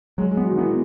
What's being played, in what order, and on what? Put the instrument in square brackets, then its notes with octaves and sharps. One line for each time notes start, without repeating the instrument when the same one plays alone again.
[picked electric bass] F#3 [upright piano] G#3
[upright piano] G#3
[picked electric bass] B3
[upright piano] F#3
D#3
[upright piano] E3 [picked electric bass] B3